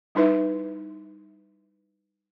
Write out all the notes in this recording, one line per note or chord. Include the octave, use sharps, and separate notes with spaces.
G3 D#4 E4 B4 E5